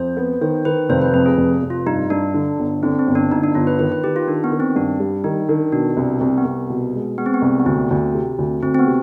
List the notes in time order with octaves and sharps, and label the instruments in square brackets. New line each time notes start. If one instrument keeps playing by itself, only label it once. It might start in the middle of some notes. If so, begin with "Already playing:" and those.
Already playing: [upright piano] F2 [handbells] C5
[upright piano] B3
[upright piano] D#3 [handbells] C5
[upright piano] D#3 [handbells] B4
[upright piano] F1 [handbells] C5
[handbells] B4
[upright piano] F2 [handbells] B4
[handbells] G#4
[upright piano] F1
F1
[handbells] F4
[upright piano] G2 [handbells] D#4
[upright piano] G2 [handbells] D4
[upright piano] D3
G1
[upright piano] D3 [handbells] C4
[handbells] C4
[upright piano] G1
[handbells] D4
[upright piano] G1 [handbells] D#4
[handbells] D4
[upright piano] G1 [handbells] F4
[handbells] B4
[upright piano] D#3 [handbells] B4
[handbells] B4
[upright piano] D#3 [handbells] G4
[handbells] F4
[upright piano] D#3 [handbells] D4
[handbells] B3
[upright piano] D#3
[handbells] C4
[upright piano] G2 [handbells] D4
[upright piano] G3
[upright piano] D#3 [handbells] D#4
[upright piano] D#3 [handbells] D4
[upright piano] B2 [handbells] D4
[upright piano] C2
[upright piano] C2 [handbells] C4
[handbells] B3
[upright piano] C2
B2
G#3
[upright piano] G#3 [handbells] B3
[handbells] C4
B3
[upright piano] C2
[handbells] B3
[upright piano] D2 [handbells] C4
[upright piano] D2
C3
D2
[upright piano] D2 [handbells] C4
[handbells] C4
B3
[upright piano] C3